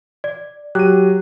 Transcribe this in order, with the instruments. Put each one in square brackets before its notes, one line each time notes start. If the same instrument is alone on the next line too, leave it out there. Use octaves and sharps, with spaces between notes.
[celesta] D5
[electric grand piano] F#3 D#7 [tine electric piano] G4 [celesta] F#6